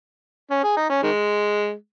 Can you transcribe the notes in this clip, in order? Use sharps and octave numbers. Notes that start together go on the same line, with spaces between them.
C#4
G#4
D#4
C#4
D#3 G#3